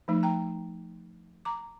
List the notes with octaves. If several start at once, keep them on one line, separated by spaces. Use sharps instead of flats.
F3 A3 D#4
G5 A#5
A#5 D6